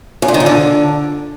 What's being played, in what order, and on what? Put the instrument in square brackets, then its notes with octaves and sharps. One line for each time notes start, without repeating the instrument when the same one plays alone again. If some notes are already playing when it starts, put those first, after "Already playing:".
[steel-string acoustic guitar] F#2
A#2
D#3
A#2
D3